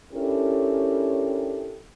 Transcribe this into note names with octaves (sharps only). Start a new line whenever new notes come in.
C#4 D4 E4 G4 A4 A#4